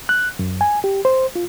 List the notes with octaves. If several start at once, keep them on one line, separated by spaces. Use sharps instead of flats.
F#6
F#2
G#5
G4
C5
F4